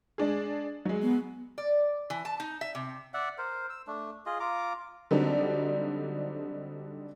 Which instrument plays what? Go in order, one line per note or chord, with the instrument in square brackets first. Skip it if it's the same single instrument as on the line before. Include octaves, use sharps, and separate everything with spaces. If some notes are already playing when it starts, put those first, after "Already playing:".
[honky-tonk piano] G#3 D4 G#4
F#3 G#3
[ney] B3
[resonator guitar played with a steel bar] D5
E3
A5
D#4
E5
C3
[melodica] D5 E5 F#5
A#4 C5
E6
A3 D4
F4 G#4 D#5
F4 A#5 D6
[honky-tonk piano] D3 F#3 G3 C4 D4 D#4